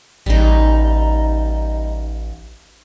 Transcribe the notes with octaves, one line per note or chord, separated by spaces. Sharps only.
A1 G3 D#4